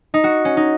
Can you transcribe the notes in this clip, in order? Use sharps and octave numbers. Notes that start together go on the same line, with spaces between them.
D#4
F#4
C#4
D#4